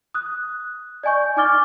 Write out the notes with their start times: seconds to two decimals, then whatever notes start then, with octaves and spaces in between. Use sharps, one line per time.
0.14 D#6 F#6
1.03 D5 D#5 G#5 C#6 G6
1.37 D#4 G#5 D6 F6 A6 G7